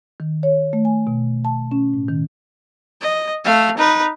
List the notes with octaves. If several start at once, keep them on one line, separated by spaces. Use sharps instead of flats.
D#3
C#5
A3
G#5
B2
A5
C#4
A2
D#3
D#5
A3 F5
D#4 B4